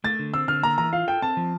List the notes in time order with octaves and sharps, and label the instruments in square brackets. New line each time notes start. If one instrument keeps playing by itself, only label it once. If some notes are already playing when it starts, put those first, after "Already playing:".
[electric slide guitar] A3 [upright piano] A6
[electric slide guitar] D3
[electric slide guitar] C4 [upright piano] E6
[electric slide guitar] D3 [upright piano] F6
[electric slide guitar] A#3 [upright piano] A#5
[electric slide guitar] E3 [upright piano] A#5
[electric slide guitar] F4 [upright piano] F5
[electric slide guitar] A4 [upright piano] G5
[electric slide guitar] C4 [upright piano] A5
[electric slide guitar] F3